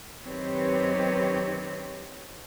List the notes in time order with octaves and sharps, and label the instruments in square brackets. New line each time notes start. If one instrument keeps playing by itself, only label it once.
[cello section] F#2 D#3 C4 G4 B4 C#5